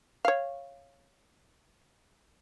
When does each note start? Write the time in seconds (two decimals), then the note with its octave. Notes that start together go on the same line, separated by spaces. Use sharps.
0.25 C#5 F5